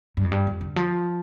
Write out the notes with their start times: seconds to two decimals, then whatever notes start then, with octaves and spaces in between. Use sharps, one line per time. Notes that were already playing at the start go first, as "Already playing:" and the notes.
0.17 G2
0.24 F2
0.32 G2
0.47 F2
0.61 D3
0.76 F3